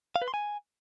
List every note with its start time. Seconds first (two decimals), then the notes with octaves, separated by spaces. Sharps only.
0.16 F5
0.22 B4
0.28 C6
0.34 G#5